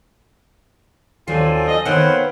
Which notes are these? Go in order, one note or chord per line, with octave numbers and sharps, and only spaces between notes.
D#2 F#3 C4 D4 F4 A4 G#5
D#5
D#3 B3 C4 B4 C#5 F5 F#5